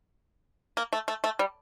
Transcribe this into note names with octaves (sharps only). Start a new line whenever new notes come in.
A#3
A3
A3
A3
G3